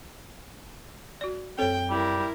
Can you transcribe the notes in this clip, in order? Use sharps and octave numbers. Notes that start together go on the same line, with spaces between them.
F#4 D5
F#2 C4 A4 C#5 G5
G3 E4 A#4